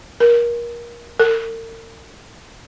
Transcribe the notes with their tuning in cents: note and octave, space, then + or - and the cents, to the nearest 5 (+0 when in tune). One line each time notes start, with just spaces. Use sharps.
A#4 +25
A#4 -45